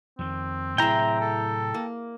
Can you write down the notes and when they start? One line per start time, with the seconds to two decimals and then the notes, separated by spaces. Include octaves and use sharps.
0.19 F2 D#3 C4
0.78 A2 C3 F#3 E4 G#4 E5 G5 A#5
1.21 A4
1.74 A#3